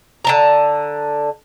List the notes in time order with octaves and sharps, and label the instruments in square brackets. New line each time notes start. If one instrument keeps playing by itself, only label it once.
[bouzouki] D3 A5 A#5